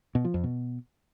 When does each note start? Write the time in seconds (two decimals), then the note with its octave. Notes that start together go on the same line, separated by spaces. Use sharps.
0.15 B2
0.25 F3
0.34 F2
0.44 B2